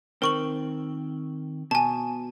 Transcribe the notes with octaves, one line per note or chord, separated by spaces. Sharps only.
D#3 C4 A#4 C#6 F#7
B2 G#5 A5